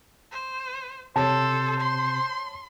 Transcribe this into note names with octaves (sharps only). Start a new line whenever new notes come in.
C5
C3 A4 C5 C#5 A5
C6